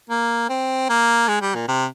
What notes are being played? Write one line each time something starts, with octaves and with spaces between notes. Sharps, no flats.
A#3
C4
A#3
G#3
G3
A#2
C3